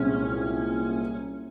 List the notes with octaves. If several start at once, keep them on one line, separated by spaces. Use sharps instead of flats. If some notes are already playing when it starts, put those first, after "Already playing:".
Already playing: C2 A#2 G#3 C4 C#4